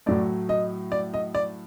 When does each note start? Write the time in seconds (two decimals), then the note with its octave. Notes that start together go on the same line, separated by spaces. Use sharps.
0.06 A2 F#3 A3 D5
0.49 D#5
0.92 D5
1.14 D#5
1.35 D5